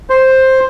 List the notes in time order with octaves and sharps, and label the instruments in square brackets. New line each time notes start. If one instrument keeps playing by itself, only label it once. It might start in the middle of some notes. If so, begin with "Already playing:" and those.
[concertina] C5